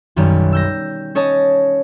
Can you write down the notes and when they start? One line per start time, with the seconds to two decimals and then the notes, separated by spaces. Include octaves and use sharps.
0.16 B1 F#2 D#3 G3
0.52 E6 G6 A#6
1.15 C#4 C#5 D#5 A5